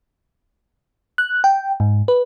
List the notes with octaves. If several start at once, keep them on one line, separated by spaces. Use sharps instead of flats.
F#6
G5
G#2
B4